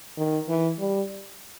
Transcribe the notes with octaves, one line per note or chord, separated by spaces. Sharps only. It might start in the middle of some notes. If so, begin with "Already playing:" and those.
D#3
E3
G3